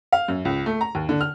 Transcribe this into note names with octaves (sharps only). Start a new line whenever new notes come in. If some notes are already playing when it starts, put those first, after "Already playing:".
F5
F#2
C#2
A3
A#5
D#2
D3
F6